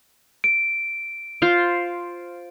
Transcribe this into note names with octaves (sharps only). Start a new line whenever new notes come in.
D7
F4 C5 F5